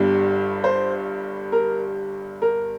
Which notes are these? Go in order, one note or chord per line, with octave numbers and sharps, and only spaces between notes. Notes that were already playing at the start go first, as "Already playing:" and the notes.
Already playing: G1 G2 G3
C5
A#4
A#4